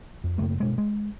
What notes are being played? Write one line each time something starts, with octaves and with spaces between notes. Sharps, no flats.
F2
F#2 C#3 A3 A#3
G2 B2 G#3
G#3